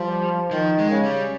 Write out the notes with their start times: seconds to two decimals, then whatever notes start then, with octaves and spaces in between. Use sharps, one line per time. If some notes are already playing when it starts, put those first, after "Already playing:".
Already playing: F3 G3
0.51 D#3 F3
0.78 G#3
0.91 C#3
1.04 G3